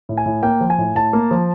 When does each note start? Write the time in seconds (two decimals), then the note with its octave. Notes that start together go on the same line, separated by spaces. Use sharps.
0.09 A2
0.17 G#5
0.26 A2
0.43 A#3 G5
0.61 F3
0.70 G#5
0.78 A2
0.95 A2 A5
1.13 A#3
1.31 F3